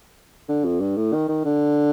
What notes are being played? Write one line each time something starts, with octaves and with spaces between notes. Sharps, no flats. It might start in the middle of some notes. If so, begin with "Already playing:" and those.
D3
F2
G2
A2
D#3
D#3
D3